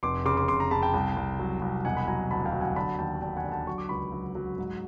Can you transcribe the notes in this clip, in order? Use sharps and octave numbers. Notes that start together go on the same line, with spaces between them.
F1 C6 D6
C#3 C6 D6
C6 D6
F1 C6 D6
A#5 C6
C#3 A5 B5
G5 A5
C2
C2
F#3
C2
E1 F#5 G#5
B5
F#3 G#5 A#5
D2 A5 B5
F5 G5
F#3
F#5 G#5
D3 A5 B5
D#2 G5 A5
D3 G5 A5
F#5 G#5
D3
G5 A5
F#3 C#6
D6
C#2 B5 C#6
F#3
F#3
G#2